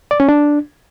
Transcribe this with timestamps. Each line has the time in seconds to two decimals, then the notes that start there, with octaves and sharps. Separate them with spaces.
0.11 D5
0.20 C#4
0.29 D4